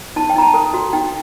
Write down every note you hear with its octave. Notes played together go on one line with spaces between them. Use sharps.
D#4 A5
G5
D#4 A#5
A5
A4
F#4
D#4 G5